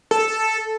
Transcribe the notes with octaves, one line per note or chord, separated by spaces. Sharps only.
A4